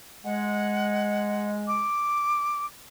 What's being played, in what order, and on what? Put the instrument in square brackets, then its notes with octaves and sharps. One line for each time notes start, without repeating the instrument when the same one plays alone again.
[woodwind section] G#3 [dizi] F#5
[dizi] D6